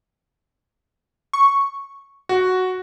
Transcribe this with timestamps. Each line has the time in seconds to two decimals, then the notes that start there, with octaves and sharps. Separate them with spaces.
1.33 C#6
2.29 F#4